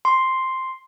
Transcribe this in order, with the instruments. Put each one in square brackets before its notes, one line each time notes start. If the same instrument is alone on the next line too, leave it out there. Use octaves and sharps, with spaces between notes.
[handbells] C6